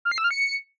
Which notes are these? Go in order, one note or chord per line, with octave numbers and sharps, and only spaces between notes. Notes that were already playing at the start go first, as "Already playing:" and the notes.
F6
C7
E6
F6
C#7